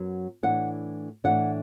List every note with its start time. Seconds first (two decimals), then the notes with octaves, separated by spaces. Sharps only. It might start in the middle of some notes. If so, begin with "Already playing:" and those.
Already playing: F#2 F#3 B3
0.43 A2 E3 D4 F#5
1.24 A2 E3 D4 F#5